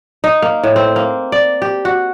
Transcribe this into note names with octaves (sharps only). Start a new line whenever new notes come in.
D#4
A#3
A2
C4
A#3
D5
G4
F#4